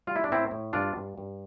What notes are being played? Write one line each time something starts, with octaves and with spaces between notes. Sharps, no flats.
G3 F4
E4
D4
A2 C4 E4
A2
G2 D4 F4
G2
G2